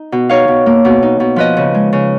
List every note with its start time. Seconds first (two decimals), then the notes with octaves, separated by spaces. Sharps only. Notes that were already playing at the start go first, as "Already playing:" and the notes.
Already playing: D#4
0.12 B2
0.29 D#4 C#5 F5
0.48 B2
0.66 A#3
0.85 B2
1.02 D#4
1.20 B2
1.36 F3 B4 D#5
1.57 C#3
1.74 G#3
1.93 C#3